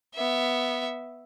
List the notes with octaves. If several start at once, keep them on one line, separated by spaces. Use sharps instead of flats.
B3 E5